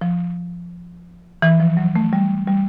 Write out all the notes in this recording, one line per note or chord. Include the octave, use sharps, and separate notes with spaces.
F3
E3
F3
F#3
A3
G3
G3